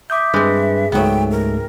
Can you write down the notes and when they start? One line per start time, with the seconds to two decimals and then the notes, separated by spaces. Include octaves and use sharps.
0.10 E5 D6 D#6 G6
0.34 G2 G#3 C4 G#4 B4
0.92 C#2 G#2 F#3 A3 B3 G5
1.31 A#4